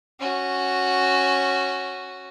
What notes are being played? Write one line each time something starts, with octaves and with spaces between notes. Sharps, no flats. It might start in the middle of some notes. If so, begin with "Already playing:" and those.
C#4 F#4